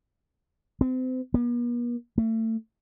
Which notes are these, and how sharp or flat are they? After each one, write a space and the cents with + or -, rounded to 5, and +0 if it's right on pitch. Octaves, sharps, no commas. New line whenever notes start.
C4 -35
B3 -45
A3 +30